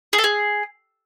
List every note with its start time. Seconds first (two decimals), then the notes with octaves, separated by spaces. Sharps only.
0.13 G#4
0.18 A4
0.24 G#4